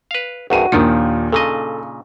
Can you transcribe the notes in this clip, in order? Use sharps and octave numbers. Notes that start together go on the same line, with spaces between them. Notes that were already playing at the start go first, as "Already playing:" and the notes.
B4 F5
G#1 E2 G2 F#4 D#7
D#2 A#2 D#3 F3 D4 D#4 A#4
A#2 C#3 A4 D#5